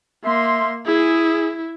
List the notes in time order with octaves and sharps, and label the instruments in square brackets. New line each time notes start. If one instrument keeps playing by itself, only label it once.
[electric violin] A#3 [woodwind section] E5 C6
[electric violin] E4 [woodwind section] G#4